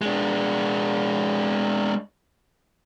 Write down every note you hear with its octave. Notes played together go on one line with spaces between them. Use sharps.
G#3 D4